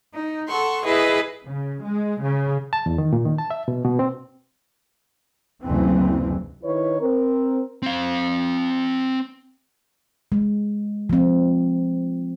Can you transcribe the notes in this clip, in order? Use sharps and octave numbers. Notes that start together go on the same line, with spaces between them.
D#4
A4 F#5 C6 C#6
E4 G#4 B4 D#5 E5
C#3
G#3
C#3
A5
E2
D#3
A#2
D#3
A5
E5
B2
B2
C4
F#1 D2 C3 E3 C4
D#3 E4 B4 C#5
C4 A#4
C4 F5
G#3
F3 C4